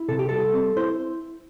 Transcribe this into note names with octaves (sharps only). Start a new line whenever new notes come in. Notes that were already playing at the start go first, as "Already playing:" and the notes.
Already playing: E4
C3 A4
G4
G3 A4
C4
E4 C5